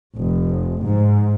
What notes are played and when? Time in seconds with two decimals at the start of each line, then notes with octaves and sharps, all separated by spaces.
0.16 F1
0.84 G#2